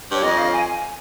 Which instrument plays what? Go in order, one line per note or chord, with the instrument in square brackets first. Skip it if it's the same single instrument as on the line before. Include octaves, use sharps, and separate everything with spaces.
[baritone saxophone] G2 [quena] C#5
[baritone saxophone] F2 [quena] D#5
[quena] F5
G#5